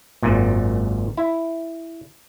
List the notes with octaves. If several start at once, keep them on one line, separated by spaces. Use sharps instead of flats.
G#1 F#2 A#2
E4